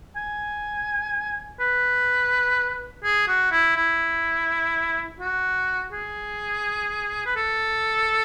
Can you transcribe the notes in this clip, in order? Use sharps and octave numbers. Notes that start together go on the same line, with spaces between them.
G#5
B4
G#4
F#4
E4
E4
F#4
G#4
B4
A4